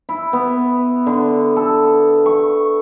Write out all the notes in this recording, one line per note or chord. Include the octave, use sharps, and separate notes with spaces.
E4
B3
D3
A4
C#6